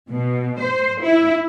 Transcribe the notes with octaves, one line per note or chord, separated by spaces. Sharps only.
B2
C5
E4